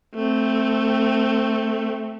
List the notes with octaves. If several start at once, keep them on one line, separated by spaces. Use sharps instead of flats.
A3 C4